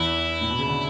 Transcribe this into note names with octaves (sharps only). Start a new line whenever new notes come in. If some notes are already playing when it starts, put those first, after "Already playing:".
Already playing: E2 E3 E4
A2
B2
C#3
D3